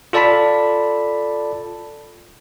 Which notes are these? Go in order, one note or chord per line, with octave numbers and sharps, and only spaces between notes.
F4 A4 D5 A5 B5 B6